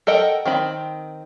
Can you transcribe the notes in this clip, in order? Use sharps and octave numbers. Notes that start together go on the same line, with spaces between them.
A4 A#4 D#5 F#5 G5
D#3 C4 B5